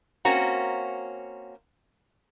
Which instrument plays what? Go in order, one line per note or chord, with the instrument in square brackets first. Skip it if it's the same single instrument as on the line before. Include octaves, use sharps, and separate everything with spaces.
[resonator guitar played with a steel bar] A#3 C4 C#4 F#4 A#5